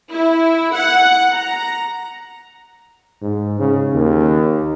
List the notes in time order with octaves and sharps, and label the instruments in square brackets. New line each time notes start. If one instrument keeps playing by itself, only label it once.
[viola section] E4
F#5
A#5
[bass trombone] G#2
C#3
D#2